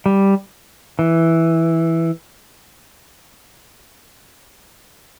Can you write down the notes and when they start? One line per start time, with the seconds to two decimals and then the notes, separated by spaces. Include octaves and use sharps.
0.06 G3
0.99 E3